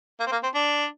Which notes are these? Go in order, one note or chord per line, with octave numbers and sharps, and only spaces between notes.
A#3
C4
A#3
C4
D4